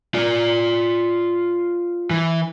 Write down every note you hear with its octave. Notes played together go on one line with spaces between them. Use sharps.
F4 D5
E3